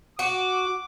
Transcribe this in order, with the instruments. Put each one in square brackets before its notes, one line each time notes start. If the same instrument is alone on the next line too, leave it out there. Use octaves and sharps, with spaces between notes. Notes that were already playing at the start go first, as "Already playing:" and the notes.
[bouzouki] F#4 [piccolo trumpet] D6